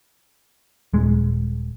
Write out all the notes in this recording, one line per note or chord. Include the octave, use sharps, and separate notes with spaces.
D#1 G#3